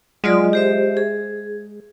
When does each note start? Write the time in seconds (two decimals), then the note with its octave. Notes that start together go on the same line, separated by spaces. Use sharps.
0.24 F#3 G#3 F4 D5
0.53 G4 C5 E5
0.97 G#4